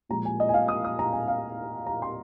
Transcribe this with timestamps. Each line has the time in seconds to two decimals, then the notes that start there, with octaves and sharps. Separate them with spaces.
0.09 A#2 F3 G#3 A#5
0.25 G#5
0.40 D#5
0.49 G#5
0.54 F5
0.68 D#6
0.84 D#6
0.99 A#5
1.13 G#5
1.28 F5
1.86 A#5
2.02 C6